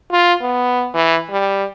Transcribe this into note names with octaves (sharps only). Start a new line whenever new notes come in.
F4
B3
E3
G3